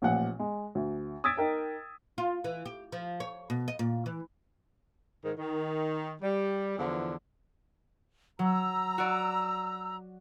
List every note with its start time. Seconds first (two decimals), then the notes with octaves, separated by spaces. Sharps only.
0.02 A1 A#2 F3 F#5
0.39 G#3
0.75 D2
1.24 D#6 E6 G#6 A6 B6 D7
1.37 D#4 A#4 G5
2.18 F4
2.44 E3
2.66 G4
2.92 F3
3.20 C#5
3.50 B2
3.68 D#5
3.79 A#2
4.06 E3
5.24 G#2 D#3
5.37 D#3
6.21 G3
6.78 E2 D3 E3 F3
8.39 F#3 A#5 E6
8.98 F#4 D5